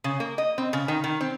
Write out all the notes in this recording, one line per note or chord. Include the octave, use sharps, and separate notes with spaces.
C#3
A#3
D#5
C4
C#3
D#3
D#3
C4